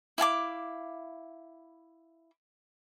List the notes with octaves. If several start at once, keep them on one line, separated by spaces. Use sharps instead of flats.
E4 F5 G#5 D6